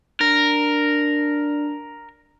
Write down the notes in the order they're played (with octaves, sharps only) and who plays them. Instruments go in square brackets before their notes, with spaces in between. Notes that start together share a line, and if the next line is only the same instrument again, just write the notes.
[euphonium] D4 [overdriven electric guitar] A#4